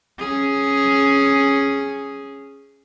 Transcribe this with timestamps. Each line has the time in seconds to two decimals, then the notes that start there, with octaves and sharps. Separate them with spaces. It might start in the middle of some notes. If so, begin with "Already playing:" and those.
0.19 C#4 G#4